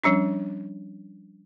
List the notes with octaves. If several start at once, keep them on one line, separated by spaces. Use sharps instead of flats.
F3 G3 C#4 D4